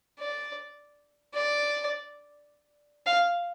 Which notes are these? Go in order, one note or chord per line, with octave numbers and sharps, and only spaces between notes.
D5
D5
F5